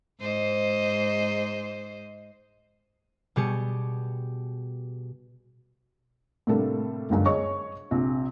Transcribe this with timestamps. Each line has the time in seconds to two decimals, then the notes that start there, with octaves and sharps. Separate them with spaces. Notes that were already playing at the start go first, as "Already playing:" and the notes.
0.20 G#2 C5 D#5
3.36 B2 G3 G4 G#4 C#7
6.47 A2 C3 G3 A#3 D4 A4
7.10 G1 C#2 F#2 D3
7.26 G#4 C#5 D#5 C#6
7.91 A#1 C3